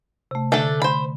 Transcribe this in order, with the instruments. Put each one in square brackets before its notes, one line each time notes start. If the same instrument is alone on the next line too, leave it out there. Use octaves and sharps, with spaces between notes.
[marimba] C3 A3
[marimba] D3 [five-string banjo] A3 D4 A4
[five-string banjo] C5 B5